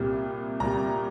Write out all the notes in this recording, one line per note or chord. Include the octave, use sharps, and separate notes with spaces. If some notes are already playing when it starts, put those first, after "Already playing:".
Already playing: C2 A#2 G3
C2 A#2 G3 A#5